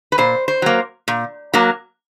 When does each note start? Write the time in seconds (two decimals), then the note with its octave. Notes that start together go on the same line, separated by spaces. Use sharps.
0.12 B4
0.18 A#2 C5
0.48 C5
0.62 F#3 A#3
1.08 A#2
1.54 F#3 A#3